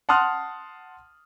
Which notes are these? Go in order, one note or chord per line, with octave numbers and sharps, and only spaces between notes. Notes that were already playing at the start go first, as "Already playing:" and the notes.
F#5 A5 C6 D#6 F6 F#6